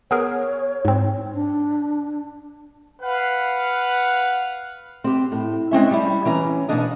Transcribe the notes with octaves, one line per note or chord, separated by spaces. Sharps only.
B3 G#4 A#4 C#5
G#2 C4
D4
B4 F5 F#5
C4 G4
A2
G#3 C4 C#4 E5
G3 E4
E3 C#4 A#5
B2 D#3 A#3 C#4 D4 D#5